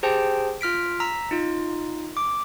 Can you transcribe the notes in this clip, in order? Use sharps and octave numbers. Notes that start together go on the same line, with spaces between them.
G4 G#4 C5 G5 A5
F4 F6 B6 D7
A#5 E6 B6
D#4 F4
D6